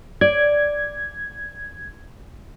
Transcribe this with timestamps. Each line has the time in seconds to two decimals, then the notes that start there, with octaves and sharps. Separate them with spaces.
0.21 D5 G#6